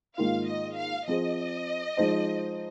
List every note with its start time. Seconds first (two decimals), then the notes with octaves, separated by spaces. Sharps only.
0.18 G#2 D#3 A#3 F4 F5
0.48 D#5
0.78 F5
1.08 F3 C4 G#4 C5 D#5
1.97 F3 G#3 D#4 C5